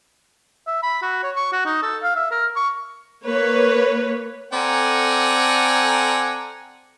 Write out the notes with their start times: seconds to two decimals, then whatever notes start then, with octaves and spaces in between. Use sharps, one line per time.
0.67 E5
0.83 B5
1.02 F#4
1.23 C#5
1.36 C#6
1.53 F#4
1.65 D#4
1.83 A4
2.03 F5
2.16 E5
2.31 A#4
2.56 C#6
3.26 A#3 B4 C#5
4.53 C4 A4 D5 F#5 G#5 A#5